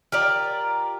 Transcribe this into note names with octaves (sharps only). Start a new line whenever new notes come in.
F4 G4 A#4 D5